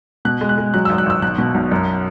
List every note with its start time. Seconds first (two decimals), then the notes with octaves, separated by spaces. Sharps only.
0.25 B2 F#6
0.41 G#3
0.49 F#6
0.58 G#3
0.74 F#3 F#6
0.85 E6
0.89 G#1
0.98 F#6
1.06 G#1 E6
1.22 B1 F#6
1.38 B2
1.54 B1
1.71 F#2